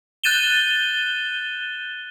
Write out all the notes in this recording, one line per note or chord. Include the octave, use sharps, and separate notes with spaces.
F#6 G6 A6 D#7 E7 G7